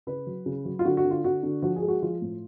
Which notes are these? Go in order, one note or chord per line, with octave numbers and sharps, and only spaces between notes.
C#3 B4
F#3
C#3
F#3
F4
D3 F#4
F#4
D3
F4
D3 F#4
D3
F3 F#4
G#4
G#3
F#4
F3 F4
A2